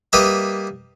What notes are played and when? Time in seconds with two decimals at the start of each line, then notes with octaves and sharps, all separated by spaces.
0.13 G3 A#3 B4 D#5 E5 B5